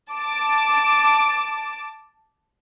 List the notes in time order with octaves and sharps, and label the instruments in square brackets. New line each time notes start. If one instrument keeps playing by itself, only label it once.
[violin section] A5 D6